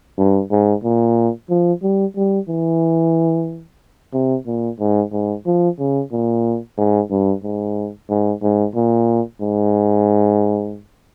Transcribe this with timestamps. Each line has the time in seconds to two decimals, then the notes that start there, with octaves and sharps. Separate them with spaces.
0.18 G2
0.51 G#2
0.84 A#2
1.50 F3
1.82 G3
2.16 G3
2.48 E3
4.13 C3
4.47 A#2
4.80 G#2
5.12 G#2
5.46 F3
5.79 C#3
6.12 A#2
6.78 G#2
7.11 G2
7.44 G#2
8.09 G#2
8.42 G#2
8.75 A#2
9.41 G#2